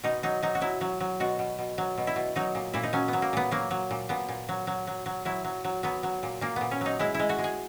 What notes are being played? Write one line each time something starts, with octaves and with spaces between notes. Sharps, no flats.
B2 D#4
F#3 D#4
F#3 D#4
F#4
F#3 E4
F#3
F#3
B2 F#4
B2
B2
F#3
B2
E4
B2
F#3 D#4
A#2
A#2 E4
D#4
F#3 C#4
F#3 B3
A#3
A#2 B3
F#3 A#3
F#3
A#2
A#2 B3
A#2
F#3
F#3
F#3
F#3
F#3 E4
F#3
F#3
F#3 B3
F#3
A#2
A#2 A#3
A#2 B3
C#4
F#3 D#4
G#3 E4
G#3 E4
F#4
G#3
G#4